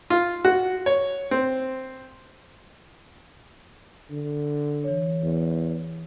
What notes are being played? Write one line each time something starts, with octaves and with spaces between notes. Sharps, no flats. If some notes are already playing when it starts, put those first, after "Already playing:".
F4
F#4
C#5
C4
D3
E3 C#5
E2